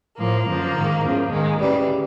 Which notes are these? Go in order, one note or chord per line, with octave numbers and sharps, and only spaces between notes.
A2 F3 A#3
F#2 D3 F3
G#2 D#3
E2 C#3 F3
G#2 D#3 G#3
D2 C#3 E3 G3